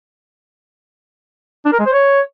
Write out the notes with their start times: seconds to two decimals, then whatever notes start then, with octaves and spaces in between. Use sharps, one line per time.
1.65 D4
1.72 A#4
1.79 G#3
1.86 C5
1.93 C#5